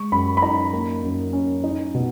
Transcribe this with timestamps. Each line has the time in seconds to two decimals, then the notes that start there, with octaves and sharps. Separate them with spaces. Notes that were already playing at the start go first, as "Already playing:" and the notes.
Already playing: G#3 C#6
0.12 F#2 B5
0.37 B5
0.42 D#4 A#5
0.73 A#3
1.04 F#2
1.33 C#4
1.64 D#4
1.94 B2